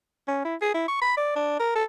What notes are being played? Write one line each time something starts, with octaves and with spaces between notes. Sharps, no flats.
C#4
E4
G#4
E4
C#6
B5
D5
D4
A#4
A4